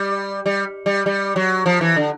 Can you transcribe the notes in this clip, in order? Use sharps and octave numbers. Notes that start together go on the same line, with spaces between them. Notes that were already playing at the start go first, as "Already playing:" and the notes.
Already playing: G3
G3
G3
G3
F#3
F3
E3
D3